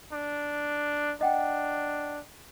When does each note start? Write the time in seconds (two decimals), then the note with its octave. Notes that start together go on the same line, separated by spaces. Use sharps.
0.13 D4
1.21 D4 D#5 F#5 G5